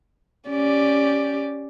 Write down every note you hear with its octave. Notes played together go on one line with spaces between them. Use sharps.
C#4 G4 D5